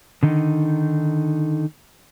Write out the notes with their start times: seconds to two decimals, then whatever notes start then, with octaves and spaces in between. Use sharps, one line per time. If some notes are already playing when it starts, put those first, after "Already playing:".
0.23 D3 D#3 D#4